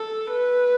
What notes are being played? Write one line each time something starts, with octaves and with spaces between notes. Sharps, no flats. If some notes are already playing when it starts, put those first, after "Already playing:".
Already playing: A4
B4